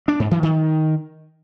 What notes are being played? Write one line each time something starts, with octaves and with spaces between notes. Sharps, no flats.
D4
G#2
E3
D#3